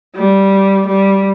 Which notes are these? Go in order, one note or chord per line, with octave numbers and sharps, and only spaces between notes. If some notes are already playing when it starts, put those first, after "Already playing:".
G3
G3